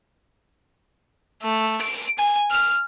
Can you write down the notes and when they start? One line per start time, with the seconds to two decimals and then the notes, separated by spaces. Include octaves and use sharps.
1.43 A3
1.82 D7
2.19 G#5
2.51 F6